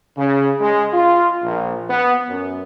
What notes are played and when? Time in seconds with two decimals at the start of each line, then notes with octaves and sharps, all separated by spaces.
0.16 C#3
0.60 G#3
0.92 F4
1.43 A#1
1.88 B3
2.28 F#2